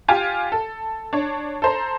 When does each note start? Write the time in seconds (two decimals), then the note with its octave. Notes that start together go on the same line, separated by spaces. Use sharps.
0.08 F4 G4 G#5
0.52 A4
1.13 D4 C#5
1.62 A4 C5 A#5